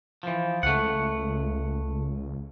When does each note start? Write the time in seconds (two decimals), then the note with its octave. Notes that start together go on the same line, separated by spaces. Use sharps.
0.23 E3 F3
0.63 C#2 A3 F#5